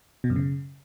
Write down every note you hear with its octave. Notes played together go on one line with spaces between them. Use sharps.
B2
F#2
C#3